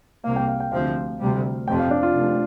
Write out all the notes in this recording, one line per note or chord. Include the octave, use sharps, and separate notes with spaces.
C2 C3 A#3 F5
G5
F5
G5
D2 C3 F3 C4 F5
D2 C3 G3
F1 F2 C3 F3 G5
F5
D4
F4
F1